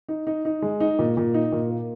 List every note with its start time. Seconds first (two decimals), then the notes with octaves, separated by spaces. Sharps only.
0.09 D#4
0.27 D#4
0.45 D#4
0.62 G#3
0.80 D#4
0.99 A#2
1.17 A#2
1.34 D#4
1.52 A#2
1.70 A#3